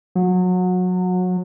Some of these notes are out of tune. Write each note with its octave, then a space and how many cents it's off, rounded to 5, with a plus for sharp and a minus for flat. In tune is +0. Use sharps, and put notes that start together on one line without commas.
F#3 -25